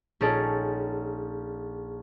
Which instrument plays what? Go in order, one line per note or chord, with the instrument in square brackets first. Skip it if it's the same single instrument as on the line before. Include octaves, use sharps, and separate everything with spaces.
[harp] A#1 C#4 D#4 G#4 A4 D7